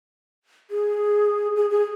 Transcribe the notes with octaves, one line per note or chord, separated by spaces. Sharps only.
G#4
G#4
G#4